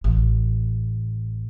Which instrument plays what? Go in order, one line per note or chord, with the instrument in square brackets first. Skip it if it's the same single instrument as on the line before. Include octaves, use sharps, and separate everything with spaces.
[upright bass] A1